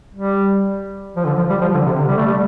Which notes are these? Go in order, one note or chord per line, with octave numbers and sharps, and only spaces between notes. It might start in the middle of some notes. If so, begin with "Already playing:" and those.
G3
F3
D3
F3
G3
F3
D3
C3
D3
G3
A3
G3